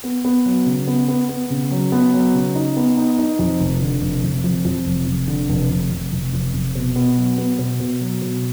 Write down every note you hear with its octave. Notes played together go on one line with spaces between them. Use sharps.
B3
B3
F#3
C#3
B3
B3
B3
C#3
F#3
B3
F#3
C#3
D#4
B3
D#4
D#4
F2
F1
D3
F1
F1
F2
F2
F1
F1
D3
F1
F1
F1
F1
F1
F1
B2
B3
F#3
B3
B2
B2
F#3
B2